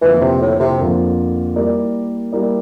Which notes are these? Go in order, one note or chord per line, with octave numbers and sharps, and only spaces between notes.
F2 D3 E3 F3 A#3 F4
C3
A2
C3
F2 D3 F3 A#3 F4
G3 A#3 E4 A#4 D5
G3 A#3 E4 A#4 D5